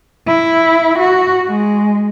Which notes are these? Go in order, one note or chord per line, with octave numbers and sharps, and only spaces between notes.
E4
F#4
G#3